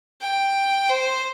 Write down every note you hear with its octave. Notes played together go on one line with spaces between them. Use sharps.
G5
C5